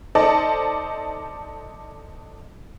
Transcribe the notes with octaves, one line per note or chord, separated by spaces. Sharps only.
D#4 A4 C5 D5 D#5 A5